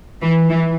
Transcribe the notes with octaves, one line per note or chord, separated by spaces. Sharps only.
E3
E3